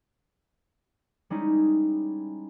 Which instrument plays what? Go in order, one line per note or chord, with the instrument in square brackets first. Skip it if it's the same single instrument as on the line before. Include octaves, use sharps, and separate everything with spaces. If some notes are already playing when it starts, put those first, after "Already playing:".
[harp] G3 G#3 C#4 D#4 E4